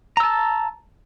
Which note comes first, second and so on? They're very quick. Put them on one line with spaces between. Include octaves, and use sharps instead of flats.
A#5 E6 A5